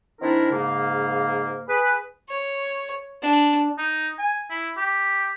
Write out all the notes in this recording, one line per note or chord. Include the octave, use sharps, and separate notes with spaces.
D#3 C4 D4 E4 A#4
G#2 C#3 A#3
G#4 B4 B5
C#5
D4
D#4
G#5
E4
G4